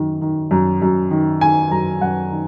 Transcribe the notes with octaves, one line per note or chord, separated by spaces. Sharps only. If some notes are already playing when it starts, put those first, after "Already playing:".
Already playing: F#2 D#3
D#3
F#2
F#2
D#3
D#3 G#5
F#2 A#5
F#2 F#5
D#3